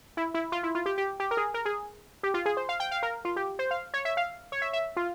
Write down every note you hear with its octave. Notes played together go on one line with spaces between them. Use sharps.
E4
E4
F4
E4
F4
G4
G4
G4
A#4
G#4
A#4
G#4
G4
F4
G#4
C5
F5
G5
F5
A#4
F4
G4
C5
F5
C#5
E5
F5
C#5
E5
E5
F4